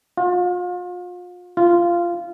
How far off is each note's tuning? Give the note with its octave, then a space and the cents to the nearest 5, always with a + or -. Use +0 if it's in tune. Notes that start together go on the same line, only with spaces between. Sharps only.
F4 +35
F4 -15